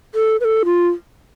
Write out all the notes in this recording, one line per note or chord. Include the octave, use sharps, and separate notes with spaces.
A4
B4
A4
F4